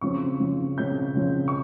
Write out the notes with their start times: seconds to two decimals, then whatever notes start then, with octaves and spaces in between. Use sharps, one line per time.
0.01 C#3 F3 C4 C#6
0.40 C#3 F3 C4
0.78 C#3 F3 C4 G6
1.15 C#3 F3 C4
1.48 C#6